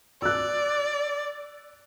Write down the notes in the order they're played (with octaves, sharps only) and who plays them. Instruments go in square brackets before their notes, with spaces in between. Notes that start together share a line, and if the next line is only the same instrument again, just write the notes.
[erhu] D5 [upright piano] E6 F#6